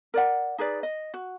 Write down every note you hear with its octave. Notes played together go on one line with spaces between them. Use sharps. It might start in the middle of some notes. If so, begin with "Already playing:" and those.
A#4 D5 F#5
D#4 G#4 B4 D5
D#5
F#4